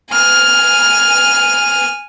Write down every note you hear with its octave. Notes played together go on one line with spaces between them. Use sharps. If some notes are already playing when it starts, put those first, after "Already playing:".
G#5 F6